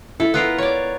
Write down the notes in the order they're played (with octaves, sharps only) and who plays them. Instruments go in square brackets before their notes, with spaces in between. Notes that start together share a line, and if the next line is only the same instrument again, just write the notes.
[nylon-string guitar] E4 [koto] A4
[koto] B3 F4 A#4
C#5 D5